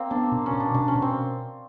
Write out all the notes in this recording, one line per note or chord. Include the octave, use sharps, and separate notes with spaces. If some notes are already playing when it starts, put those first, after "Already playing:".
Already playing: A#3 C4
B3 D4
B2
C#4
B2
D4
B2 D4
C#4
B2
C4